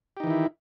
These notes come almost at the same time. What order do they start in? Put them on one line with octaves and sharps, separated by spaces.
G4 D#4 E3 D#3 E4